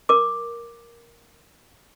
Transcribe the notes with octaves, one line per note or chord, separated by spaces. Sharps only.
A#4 D6